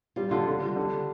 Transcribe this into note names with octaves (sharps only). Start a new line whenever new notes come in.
G3 F4
D3 F4
D3
G3
D3